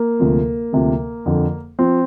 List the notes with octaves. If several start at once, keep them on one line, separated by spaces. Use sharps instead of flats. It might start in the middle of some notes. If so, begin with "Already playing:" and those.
Already playing: A#3
D2 C3 F3
D2 C3 F3
F2 D3 F3
F3 C4